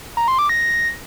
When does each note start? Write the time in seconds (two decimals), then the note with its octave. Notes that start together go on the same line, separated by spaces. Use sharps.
0.17 A#5
0.28 C6
0.39 D6
0.49 A#6